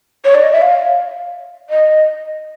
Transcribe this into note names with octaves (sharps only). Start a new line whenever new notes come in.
C#5
D5
D#5
E5
F5
D#5